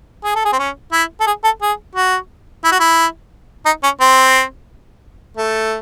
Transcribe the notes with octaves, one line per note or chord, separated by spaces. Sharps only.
G#4
A4
G#4
C4
C#4
E4
A4
G#4
A4
G#4
F#4
E4
F#4
E4
D#4
C#4
C4
A3